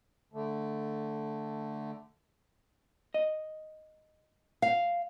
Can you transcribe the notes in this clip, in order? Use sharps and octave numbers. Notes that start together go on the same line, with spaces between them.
D3 A3
D#5
F5